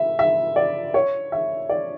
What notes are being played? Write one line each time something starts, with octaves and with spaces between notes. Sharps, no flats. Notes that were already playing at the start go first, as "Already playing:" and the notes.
Already playing: E5
E5
D5
C#5
E5
D5